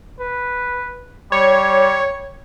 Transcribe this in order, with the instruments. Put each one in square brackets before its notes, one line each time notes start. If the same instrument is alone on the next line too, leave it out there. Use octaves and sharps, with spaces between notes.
[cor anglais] B4
[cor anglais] G3 [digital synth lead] C#5